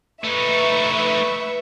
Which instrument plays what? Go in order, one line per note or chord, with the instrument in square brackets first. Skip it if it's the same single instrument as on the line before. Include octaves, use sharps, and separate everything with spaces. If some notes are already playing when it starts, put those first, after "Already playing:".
[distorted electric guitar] A3 D#4 [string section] B4 E5 C#6